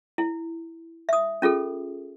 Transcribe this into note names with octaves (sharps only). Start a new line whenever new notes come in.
E4
E5 D#6
C#4 F4 G#4 A4